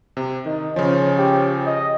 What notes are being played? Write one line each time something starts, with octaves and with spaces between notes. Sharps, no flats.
C3
D#3 D#4
C#3 F3 C#4 C5
G4
D#5